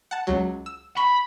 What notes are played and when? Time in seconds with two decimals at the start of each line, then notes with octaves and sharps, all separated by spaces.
0.11 F#5 A5
0.27 C#2 F#3
0.66 E6
0.97 B5 C#6